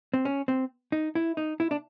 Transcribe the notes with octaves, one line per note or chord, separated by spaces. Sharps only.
C4
C#4
C4
D#4
E4
D#4
E4
D4